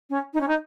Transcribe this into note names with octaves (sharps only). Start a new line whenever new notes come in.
C#4
D#4
C#4
D#4